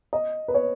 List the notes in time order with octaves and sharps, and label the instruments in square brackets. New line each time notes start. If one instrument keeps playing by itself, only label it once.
[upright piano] D#5
B4
C#5